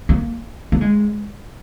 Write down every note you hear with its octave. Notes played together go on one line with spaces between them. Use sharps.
A#3
A#3
G#3